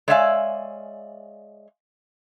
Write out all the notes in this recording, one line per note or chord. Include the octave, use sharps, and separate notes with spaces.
G#3 C#5 D5 E5 F5 G#5